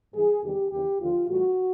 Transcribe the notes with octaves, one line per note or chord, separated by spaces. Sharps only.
G#2 E3 G3 G#4
E2 C3 D#3 G3 G4
D#2 C#3 E3 G4
D#2 D3 F3 F4
A2 E3 G3 F#4